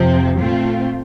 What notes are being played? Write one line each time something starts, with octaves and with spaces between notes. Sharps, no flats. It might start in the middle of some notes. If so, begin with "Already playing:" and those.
Already playing: F2 C3 F3 C4
A#2 A3 C4 F4